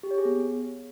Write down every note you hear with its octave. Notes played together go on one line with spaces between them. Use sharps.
G4
C#5
G#4
B3